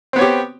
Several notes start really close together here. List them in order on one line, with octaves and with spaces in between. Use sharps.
C4 B3 C#5 G4